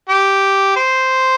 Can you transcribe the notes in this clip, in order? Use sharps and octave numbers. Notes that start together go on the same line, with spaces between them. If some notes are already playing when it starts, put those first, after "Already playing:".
G4
C5